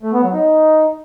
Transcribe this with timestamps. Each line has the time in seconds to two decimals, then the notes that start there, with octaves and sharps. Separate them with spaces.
0.03 A3
0.13 B3
0.23 F#3
0.33 D#4